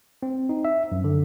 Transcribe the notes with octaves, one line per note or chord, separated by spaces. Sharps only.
C4
D#4
E5
F#2
D3